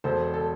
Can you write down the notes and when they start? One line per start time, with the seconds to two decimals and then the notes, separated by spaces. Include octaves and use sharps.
0.04 E1 A4 C5
0.34 A4